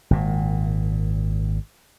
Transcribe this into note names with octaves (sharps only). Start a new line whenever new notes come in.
G#1 A#2